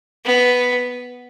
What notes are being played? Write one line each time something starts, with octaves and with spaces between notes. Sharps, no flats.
B3